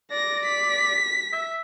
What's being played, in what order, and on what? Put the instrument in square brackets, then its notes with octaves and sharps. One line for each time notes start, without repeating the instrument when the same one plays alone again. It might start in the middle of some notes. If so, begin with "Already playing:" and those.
[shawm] D5 [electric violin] A#6
[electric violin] B6
[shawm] E5